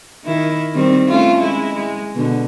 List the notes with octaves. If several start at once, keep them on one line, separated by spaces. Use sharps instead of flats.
D#3 E4
D#3 G3 C4
A3 C#4 F4
G#3 E4
G#3
B2 D3